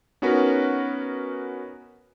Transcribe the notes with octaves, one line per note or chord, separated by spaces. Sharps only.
B3 C#4 D#4 F#4 A#4 B4